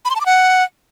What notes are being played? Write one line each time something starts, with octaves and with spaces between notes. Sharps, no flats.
B5
C6
A5
D6
F#5